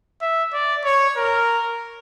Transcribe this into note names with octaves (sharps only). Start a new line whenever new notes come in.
E5
D5
C#5
A#4